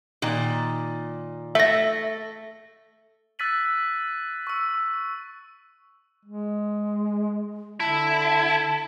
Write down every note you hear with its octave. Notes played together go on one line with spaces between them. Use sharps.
A#2 D#3
A3 E5 A#6
E6 F#6 A6 B6 D#7 F#7
C#6 E6
G#3
D3 E4 A5